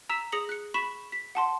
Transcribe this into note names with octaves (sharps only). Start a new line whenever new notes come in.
A#5 E6 B6 E7
G#4 D#6 A#6 C#7 F#7
F#6 C#7
B5 C#6 B6 E7
B6
F#5 A5 C6